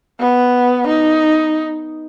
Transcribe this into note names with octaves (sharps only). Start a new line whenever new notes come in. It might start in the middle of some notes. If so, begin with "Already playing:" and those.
B3
D#4